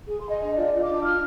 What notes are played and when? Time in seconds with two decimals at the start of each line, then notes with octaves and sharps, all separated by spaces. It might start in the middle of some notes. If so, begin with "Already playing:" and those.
0.08 G#4
0.19 C6
0.25 G#4 D#5
0.41 D4 D#5
0.56 F4 D5
0.73 F4 D#5
0.82 D6
0.89 D4
0.94 D6
1.04 F4 F6